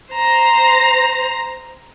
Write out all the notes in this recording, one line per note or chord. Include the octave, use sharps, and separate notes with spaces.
C5 A#5